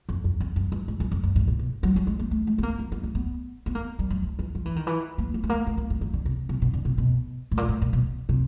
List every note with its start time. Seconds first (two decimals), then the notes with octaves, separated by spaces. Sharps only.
0.09 F2
0.24 F2
0.40 F2
0.56 F#2
0.72 G2
0.88 G#2
1.00 F#2
1.11 F2
1.23 G2
1.36 G#2
1.48 A#2
1.59 B2
1.83 F#3
1.96 F#3
2.07 G#3
2.19 A#3
2.31 A3
2.47 G#3
2.58 B3
2.63 A#3
2.79 A#3
2.92 B3
3.03 A#3
3.15 B3
3.66 B3
3.75 A#3
3.99 G3
4.10 F#3
4.22 F3
4.39 E3
4.55 F3
4.65 E3
4.76 D#3
4.87 E3
5.18 A#3
5.34 A#3
5.43 A3
5.49 A#3
5.66 A3
5.77 A#3
5.90 A3
6.01 D#3
6.13 D3
6.25 C3
6.49 C3
6.62 B2
6.73 D3
6.85 C3
6.98 B2
7.51 A2
7.57 A#2
7.69 A2
7.82 A#2
7.93 B2
8.29 C3